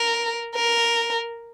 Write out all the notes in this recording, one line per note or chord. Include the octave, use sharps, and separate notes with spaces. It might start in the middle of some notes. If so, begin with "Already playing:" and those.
Already playing: A#4
A#4